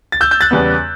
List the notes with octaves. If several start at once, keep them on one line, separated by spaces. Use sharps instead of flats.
A6
E6 G6
E6 G6
F#6 A6
E2 C#3 G3 B3